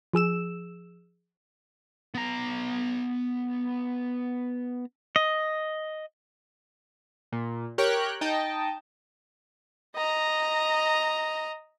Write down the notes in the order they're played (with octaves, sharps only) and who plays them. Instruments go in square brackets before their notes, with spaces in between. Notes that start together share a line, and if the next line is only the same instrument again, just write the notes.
[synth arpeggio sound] F3 G#4 E6 E7
[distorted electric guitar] B3 A#5
[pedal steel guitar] D#5
[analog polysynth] A#2
G4 A#4 C#5 G5 F#6
D#4 D#5 G5 A5
[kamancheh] D#5 A#5